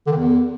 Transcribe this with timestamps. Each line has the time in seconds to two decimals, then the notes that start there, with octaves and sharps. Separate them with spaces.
0.07 D3
0.12 D#3
0.17 E2